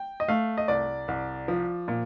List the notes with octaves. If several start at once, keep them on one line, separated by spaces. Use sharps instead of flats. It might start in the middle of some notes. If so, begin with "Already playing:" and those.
Already playing: G5
D#5
A3 F5
D#5
C2 D5
C2
F3
A#2